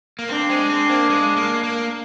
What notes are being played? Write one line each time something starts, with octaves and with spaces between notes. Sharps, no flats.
A#3
C4 D4
G#3
C4
A#3
G#3
A#3
A#3